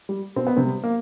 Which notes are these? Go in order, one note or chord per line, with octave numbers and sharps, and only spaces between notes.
G3
B2 C4
B3
C3 C4
G3
A#3